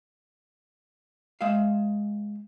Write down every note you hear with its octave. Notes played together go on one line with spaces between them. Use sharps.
G#3 E5 F5